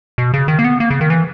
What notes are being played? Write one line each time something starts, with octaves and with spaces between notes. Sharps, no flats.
B2
C#3
D#3
A#3
B3
A#3
C#3
D#3
E3